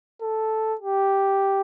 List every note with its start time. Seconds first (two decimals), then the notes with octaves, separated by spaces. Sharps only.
0.22 A4
0.81 G4